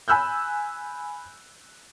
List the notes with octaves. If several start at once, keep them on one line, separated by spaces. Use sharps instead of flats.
G#5 B5 E6 F#6 G6